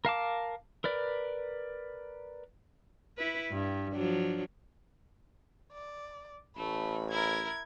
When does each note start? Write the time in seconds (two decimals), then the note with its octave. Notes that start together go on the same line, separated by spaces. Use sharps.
0.05 A#4 F5 A5 D6
0.84 A#4 B4 D5
3.18 E4 B4
3.51 G2
3.94 F3 F#3 D4
5.72 D5
6.57 A1 A3 B5
7.11 E4 A#4 G#6